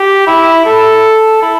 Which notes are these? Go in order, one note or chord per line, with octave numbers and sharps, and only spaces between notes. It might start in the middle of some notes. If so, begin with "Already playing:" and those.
Already playing: G4
E4
A4
E4